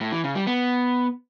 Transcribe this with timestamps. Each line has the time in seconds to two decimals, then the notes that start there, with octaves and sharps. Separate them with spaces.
0.01 A2
0.12 E3
0.24 C#3
0.35 G3
0.47 B3